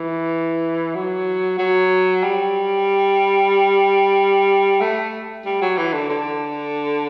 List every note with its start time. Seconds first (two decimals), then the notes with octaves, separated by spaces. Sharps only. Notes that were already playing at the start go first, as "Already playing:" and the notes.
Already playing: E3
0.95 F#3
1.59 F#3
2.23 G3
4.81 A3
5.45 G3
5.62 F#3
5.77 E3
5.93 D3
6.10 D3